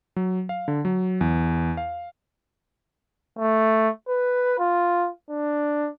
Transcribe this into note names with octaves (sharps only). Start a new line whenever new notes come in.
F#3
F5
D3
F#3
E2
F5
A3
B4
F4
D4